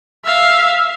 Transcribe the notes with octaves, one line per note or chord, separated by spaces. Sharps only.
E5 F5